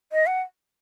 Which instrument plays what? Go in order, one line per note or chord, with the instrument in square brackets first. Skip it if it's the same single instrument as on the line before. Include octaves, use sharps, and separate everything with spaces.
[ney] D#5
F#5